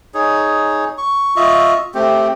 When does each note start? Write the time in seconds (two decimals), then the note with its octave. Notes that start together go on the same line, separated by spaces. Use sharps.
0.14 D#4 G#4 C#5
0.98 C#6
1.36 F4 D#5 E5 C#6
1.94 A3 C4 G4